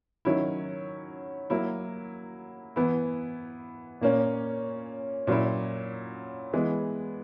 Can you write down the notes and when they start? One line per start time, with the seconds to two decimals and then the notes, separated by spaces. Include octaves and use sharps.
0.25 D#3 F#3 C#4 E4
1.50 F#3 A#3 E4
2.76 E3 B3 E4
4.01 A#2 A#3 C#4
5.27 A#2 F#3 C#4 E4
6.53 E3 G#3 B3